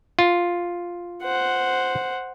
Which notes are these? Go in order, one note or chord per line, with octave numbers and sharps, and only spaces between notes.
F4
C5 F#5